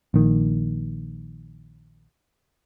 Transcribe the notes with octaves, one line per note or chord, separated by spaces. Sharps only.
A#1 D#3